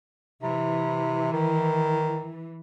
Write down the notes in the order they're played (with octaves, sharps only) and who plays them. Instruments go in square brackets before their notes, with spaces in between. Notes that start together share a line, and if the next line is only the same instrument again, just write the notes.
[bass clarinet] C3 [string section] E3
[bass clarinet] D#3